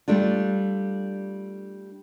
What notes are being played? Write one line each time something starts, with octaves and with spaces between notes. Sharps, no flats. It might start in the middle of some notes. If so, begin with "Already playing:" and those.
G3 A3 D4 F4